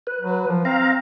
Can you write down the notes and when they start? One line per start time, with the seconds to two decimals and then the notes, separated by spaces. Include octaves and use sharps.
0.07 B4
0.21 F#3
0.47 F3
0.65 C4 F5 A#5